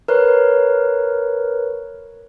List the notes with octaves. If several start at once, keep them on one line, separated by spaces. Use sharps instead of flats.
A#4 B4 C#5